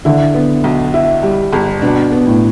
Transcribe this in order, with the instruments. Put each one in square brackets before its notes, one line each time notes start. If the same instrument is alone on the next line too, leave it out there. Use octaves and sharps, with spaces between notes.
[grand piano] D3 [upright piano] E4
[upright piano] B3
B1
E4
G3
G1
[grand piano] B2 [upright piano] D4
[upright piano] B3
[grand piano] A2